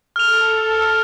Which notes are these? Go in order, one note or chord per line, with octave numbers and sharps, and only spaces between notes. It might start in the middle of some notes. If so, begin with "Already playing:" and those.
A4 F6 F7